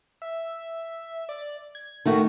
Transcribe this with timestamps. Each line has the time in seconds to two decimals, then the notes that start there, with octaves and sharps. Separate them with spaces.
0.22 E5
1.29 D5
1.75 G#6
2.06 D#3 A3 D#4 F#4